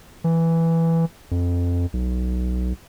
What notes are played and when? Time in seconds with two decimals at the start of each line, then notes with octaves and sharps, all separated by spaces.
0.24 E3
1.31 F2
1.93 B1